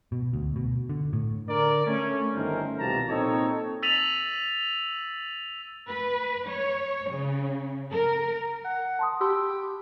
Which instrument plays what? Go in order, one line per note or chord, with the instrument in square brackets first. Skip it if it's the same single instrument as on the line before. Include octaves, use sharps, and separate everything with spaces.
[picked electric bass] B2
D2
B2
D3
A2
[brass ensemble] D3 A#4 D5
A3 C#4
G1 D#3 A3 C#4 A#4 C5
C2 B2 F3 G4 A5 A#5
A#2 C4 D#4 A4 C#5
[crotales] E6 A6 B6 D#7 F7 F#7
[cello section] B4
C#5
C#3
A#4
[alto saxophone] F#5
[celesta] A5 C6 D#6
[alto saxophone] G4 [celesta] B5 C6 E6